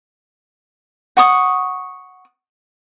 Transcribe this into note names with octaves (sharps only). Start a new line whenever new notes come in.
F#5 C#6 D#6